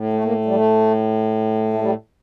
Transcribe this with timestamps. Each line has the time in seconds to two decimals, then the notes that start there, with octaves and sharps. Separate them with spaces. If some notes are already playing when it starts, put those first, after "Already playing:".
Already playing: A2
0.13 A3
0.24 A#3
0.45 G3
0.55 A3
1.73 A3
1.81 G3